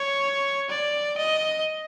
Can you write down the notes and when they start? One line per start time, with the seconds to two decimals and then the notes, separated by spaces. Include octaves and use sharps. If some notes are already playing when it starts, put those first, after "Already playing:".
Already playing: C#5
0.70 D5
1.18 D#5